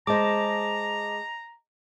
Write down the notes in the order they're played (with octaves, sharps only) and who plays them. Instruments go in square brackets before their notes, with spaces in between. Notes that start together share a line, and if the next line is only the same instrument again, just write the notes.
[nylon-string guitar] G#3 C5 [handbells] D#5 A5 D6 [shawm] A#5